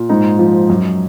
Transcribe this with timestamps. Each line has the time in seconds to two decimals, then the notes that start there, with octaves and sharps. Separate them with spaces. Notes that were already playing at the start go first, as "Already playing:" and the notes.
Already playing: A#2
0.09 G#2 D#4
0.39 F3
0.70 F#2